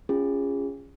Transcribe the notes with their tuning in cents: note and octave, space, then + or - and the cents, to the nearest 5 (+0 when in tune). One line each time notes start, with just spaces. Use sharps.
C#4 +0 F4 +0 G#4 -25